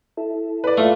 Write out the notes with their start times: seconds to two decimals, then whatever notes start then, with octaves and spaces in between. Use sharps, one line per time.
0.17 E4 A4
0.64 B4 D5
0.78 A3 F4